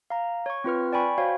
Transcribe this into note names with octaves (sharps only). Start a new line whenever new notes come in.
F5 A#5
C#5 C#6
C4 F4 B4 F6
D5 G5 G#5 B5 C#6
F#4 C5 C#5 F5 G5